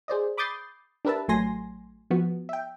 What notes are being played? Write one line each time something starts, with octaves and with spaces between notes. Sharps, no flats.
G#4 C5 D5 D#5
B5 D6 D#6 G6 A6 C7
D4 G4 A#4 B4 E5 A5
A1 F#3 A3 G#5 C6 A#6
F3 B3 F#4
E5 G5